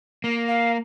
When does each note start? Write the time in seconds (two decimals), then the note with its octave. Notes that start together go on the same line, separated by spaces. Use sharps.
0.24 A#3
0.48 F5